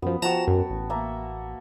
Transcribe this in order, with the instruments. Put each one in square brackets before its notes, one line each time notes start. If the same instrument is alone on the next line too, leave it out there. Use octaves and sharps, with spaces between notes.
[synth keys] F#2 F3 [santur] B3
[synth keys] F3 A#5 E7 [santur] F#4 G5 A5
[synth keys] F#2
A1
[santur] A#3 E5 A5